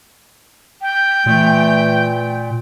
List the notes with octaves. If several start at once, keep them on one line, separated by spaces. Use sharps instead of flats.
G5
A#2 E3 A3